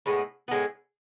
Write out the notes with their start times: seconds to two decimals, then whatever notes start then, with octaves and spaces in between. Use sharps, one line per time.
0.06 A2 G#3 B3
0.48 A2 G#3 B3